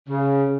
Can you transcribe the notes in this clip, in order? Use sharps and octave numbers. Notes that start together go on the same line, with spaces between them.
C#3